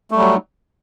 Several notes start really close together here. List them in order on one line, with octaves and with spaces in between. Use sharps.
A3 G3 F#3